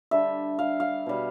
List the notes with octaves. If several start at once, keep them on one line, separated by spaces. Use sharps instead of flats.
D3 G3 E5
F5
F5
B2 G3